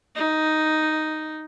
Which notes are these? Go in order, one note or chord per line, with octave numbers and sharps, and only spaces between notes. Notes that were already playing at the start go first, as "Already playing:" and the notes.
D#4